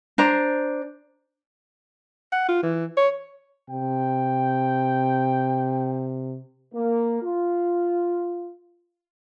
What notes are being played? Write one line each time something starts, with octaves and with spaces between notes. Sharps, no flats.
D4 C5 A#5
F#5
F4
E3
C#5
C3 G5
A#3
F4